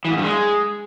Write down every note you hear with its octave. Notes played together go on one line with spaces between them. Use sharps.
E3
G#2
G2
G#3